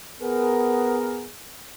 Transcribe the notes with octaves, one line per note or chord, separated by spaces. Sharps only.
B3 G#4 A#4